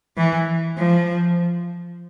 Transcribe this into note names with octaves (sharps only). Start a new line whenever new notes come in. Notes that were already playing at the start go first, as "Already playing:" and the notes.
E3
F3